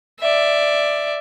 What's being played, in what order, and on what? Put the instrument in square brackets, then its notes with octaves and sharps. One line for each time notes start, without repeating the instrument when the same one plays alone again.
[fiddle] D5 E5